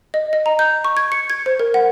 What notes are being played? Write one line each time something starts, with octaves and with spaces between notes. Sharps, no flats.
D#5
D#5
A#5
G6
C#6
G#6
C#7
G#6
C5
A#4
F#5